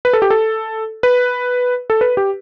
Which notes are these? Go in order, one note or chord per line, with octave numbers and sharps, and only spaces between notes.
B4
A4
G4
A4
B4
A4
B4
G4